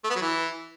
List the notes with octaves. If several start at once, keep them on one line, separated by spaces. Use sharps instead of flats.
A3
B3
F#3
E3